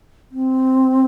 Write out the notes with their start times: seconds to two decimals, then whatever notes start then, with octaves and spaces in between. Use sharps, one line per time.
0.32 C4